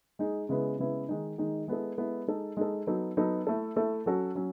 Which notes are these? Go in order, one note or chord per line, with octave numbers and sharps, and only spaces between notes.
G#3 D#4 G#4
C#3 G#3 B3 E4 B4
C#3 G#3 B3 E4 B4
D#3 G#3 D#4
D#3 G#3 D#4
G#3 B3 E4 A4
G#3 B3 E4 A4
G#3 D#4 A4
G#3 D#4 A4
F#3 B3 D#4 A4
F#3 B3 D#4 A4
A3 E4 A4
A3 E4 A4
F#3 C#4 F#4 A4
F#3 C#4